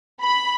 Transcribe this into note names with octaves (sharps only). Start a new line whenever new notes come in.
B5